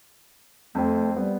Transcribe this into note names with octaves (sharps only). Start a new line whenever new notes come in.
F2 A3 C4
G3 B3